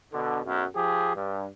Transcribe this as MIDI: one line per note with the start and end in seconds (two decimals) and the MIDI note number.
0.13 0.40 47
0.13 0.40 50
0.45 0.64 35
0.45 0.64 42
0.75 1.12 53
0.75 1.12 67
0.75 1.12 68
1.15 1.45 43